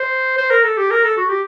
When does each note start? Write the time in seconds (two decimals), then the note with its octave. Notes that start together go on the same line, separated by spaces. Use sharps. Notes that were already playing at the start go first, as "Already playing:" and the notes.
Already playing: C5
0.38 C5
0.51 A#4
0.64 A4
0.77 G4
0.91 A#4
1.04 A4
1.17 F#4
1.29 G4